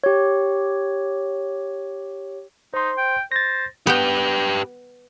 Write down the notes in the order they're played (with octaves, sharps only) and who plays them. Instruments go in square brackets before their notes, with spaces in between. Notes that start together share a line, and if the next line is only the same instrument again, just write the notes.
[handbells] G4 C#5
[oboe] D#4 [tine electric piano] C5 C6
[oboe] G5
[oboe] C5 [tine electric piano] A6 A#6
[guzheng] B3 G5 [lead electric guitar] G4 B4